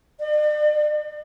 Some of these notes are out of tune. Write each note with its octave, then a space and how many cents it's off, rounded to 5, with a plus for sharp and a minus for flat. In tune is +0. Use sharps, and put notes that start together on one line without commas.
D5 +40